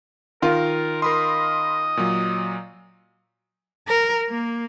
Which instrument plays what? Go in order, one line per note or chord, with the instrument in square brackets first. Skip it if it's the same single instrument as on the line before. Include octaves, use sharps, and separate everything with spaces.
[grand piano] D#3 F4 [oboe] A#4
[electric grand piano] A#4 B5 C6 [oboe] D#5
[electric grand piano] A#2 F#3
[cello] A#4
A#3